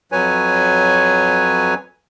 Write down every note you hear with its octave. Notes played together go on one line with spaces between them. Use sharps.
F2 F#3 B4 C#5 G#5